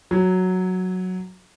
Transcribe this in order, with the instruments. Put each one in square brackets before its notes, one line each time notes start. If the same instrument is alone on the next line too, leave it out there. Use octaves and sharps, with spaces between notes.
[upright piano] F#3